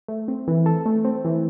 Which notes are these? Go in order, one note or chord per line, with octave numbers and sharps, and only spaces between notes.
A3
C4
E3
A4
A3
C4
E3